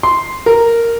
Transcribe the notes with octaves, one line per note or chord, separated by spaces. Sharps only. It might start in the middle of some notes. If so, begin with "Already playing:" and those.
C6
A#4